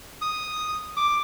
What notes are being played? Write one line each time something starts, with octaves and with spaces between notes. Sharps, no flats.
D#6
D6